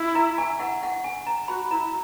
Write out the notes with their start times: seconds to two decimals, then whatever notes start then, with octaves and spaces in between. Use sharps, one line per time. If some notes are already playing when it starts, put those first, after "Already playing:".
Already playing: E4
0.15 A#5
0.38 G#5
0.60 F#5
0.83 F#5
1.04 G#5
1.26 A#5
1.48 F#4 B5
1.70 E4 A#5